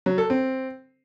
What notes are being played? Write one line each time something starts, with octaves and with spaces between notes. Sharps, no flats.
F#3
A4
C4